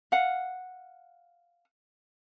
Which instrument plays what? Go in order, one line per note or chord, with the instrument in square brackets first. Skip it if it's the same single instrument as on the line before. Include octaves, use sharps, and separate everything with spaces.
[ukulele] F5 F#5